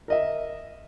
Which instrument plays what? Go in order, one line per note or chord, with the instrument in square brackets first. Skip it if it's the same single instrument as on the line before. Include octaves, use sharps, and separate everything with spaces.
[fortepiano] A#4 D#5 E5